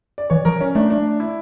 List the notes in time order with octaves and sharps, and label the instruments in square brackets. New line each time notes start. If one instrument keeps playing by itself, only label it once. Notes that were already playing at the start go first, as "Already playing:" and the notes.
[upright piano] D5
[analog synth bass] E3 [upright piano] C#5
[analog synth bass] F3 [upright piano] A#4
[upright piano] C#4
[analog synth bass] A3 [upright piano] D4
[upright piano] D4
E4